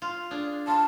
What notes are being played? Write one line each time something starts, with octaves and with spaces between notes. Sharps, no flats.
F4
D4 G#4
F4 A5